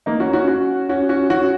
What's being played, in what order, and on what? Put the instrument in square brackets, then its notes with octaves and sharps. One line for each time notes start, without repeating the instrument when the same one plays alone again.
[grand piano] A#3 D#4
C#4 F#4
C#4 F#4
C#4 F#4
C#4 F#4
C#4 F#4
C#4 F#4